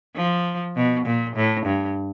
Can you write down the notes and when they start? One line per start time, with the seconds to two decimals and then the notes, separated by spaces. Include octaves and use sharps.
0.16 F3
0.76 B2
1.06 A#2
1.36 A2
1.66 G2